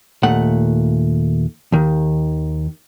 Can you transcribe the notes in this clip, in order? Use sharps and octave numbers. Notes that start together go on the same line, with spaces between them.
D#2 A#2 A3 F#5
D#2 D#3